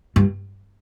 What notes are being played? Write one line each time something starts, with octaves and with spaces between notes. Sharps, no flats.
G2